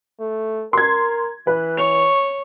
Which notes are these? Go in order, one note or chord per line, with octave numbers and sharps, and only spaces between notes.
A3
A#4 C6 G#6
E3 B4
C#5 F7